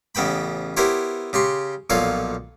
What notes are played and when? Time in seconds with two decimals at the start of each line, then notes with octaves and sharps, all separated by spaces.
0.15 A1 C#3 B3 G5 B5
0.77 B3 E4 G4 A#4 C5 C#5
1.33 C#3 G4 C6 C#6
1.90 B1 A#2 F3 A4 C#5 F5